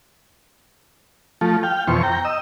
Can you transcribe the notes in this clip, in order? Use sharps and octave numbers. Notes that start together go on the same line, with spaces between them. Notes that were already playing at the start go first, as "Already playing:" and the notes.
F3 A3
F5 G5
F2 B2 E3 C5 C#6
G5 A#5
D#5 E6